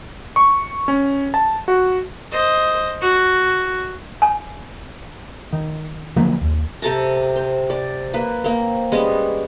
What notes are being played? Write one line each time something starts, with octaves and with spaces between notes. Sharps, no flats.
C#6
C#4
A5
F#4
C5 D#5
F#4
G#5
D#3
D3 F3 F#3 A#3
D#2
C3 A4 A5 A#5
C5
D5
A#3 B4
A#3 C4
G3 G#3 B3 C#4